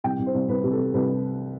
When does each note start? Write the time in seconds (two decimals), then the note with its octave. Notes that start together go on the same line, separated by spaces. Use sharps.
0.04 C2 G5
0.19 C2
0.26 C5
0.34 C2
0.49 C2 B4
0.64 C3
0.71 A4
0.78 C3
0.94 C2 B4